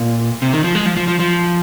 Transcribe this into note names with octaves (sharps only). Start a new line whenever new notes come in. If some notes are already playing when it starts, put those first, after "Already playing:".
Already playing: A#2
C3
D#3
F3
G#3
F3
F3
F3
F3